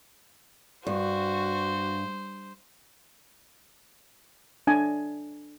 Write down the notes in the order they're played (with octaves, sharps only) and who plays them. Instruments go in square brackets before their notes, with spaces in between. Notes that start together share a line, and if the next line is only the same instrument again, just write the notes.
[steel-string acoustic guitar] G2 [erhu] F#4 [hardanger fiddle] C5
[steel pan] D4 G#5